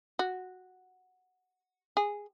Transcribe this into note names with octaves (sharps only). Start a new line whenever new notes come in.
F#4
G#4